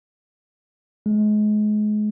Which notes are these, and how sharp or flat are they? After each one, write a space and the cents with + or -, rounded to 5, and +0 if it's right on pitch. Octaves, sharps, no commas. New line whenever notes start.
G#3 +30